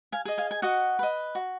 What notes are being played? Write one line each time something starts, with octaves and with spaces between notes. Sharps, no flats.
F5 G#5
G#4 D#5
F5 G#5
G#5
F#4 D#5 F#5
B4 D#5
F#4